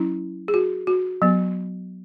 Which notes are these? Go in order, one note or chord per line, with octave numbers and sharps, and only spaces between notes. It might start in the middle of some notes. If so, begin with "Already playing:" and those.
Already playing: F#3 C#4 E4
G#4
F#4
F#4
F#3 B3